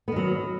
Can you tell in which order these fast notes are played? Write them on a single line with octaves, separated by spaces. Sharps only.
B3 D#3 F#3